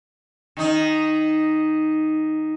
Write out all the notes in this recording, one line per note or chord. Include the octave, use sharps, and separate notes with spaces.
D#3 D#4